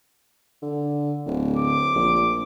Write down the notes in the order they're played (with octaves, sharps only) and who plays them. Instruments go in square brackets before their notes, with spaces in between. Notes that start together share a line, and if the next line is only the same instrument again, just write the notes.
[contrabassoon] D3
D1
[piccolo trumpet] D6
[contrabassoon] A#1